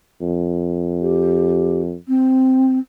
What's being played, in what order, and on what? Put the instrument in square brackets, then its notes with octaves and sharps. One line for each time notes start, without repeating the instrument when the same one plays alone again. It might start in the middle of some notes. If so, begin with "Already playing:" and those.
[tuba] F2
[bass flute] G4
C4